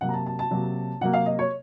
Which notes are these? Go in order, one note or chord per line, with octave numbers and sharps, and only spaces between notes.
C3 F#3 A#3 F#5
A#5
A5
A5
A5
C3 F#3 A#3
C3 F#3 A#3 F#5
F5
D#5
C#5